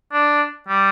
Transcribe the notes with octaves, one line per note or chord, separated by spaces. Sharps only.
D4
G3